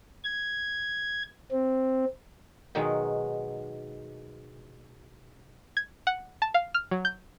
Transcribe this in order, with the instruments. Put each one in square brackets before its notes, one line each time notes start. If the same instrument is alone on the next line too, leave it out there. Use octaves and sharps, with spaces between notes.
[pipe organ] G#6
C4
[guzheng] B2 D#3 F#3 G#3
[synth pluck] G#6
F#5
A5
F5
F6
F#3
G6